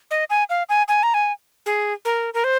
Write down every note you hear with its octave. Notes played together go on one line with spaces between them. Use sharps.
D#5
G#5
F5
G#5
G#5
A#5
G#5
G#4
A#4
A#4
C5